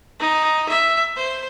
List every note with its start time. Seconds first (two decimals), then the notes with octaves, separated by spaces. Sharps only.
0.20 D#4
0.68 E5
1.16 C5